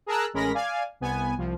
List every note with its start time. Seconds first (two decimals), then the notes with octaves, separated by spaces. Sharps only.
0.06 G#4 A#4 A5 A#5 E6 F#6
0.33 A1 G#3 C#4 A#4 B5 A#6
0.54 D5 F5 G#5
1.00 C2 B3 G#5
1.37 C2 F3